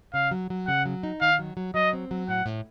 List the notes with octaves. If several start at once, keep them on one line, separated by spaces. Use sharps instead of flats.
C#3 F5
F#3
F#3
C#3 F#5
F#3
D#4
D#3 F5
F#3
F#3
F#3 D#5
C4
F#3
A2 F#5
A2